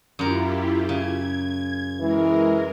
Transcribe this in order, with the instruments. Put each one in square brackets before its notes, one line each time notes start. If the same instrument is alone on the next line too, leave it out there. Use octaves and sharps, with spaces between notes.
[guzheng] F#2 A#4 [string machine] E4 F4 G4
[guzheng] C#3 [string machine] G#6
[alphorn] E3 [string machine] G#3 A#4